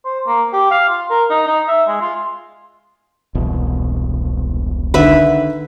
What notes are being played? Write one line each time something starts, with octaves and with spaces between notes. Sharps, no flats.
C5
A#3
G4
F5
F4
A#4
D#4
D#4
E5
G#3
F4
E1 C2 B2
D3 D#3 B4 E5